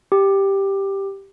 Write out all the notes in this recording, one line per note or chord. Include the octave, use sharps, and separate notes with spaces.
G4